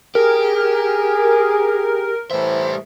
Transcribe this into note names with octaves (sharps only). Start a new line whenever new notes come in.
G4 G#4 A#4
A2 E3 G3 C5 E5